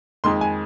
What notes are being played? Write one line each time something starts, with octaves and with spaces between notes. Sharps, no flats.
F2 D#3 G#3 C6
G#5